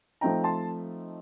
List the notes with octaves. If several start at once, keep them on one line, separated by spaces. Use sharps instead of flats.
F3 A3 C4 D#4 G5 A#5
A5 C6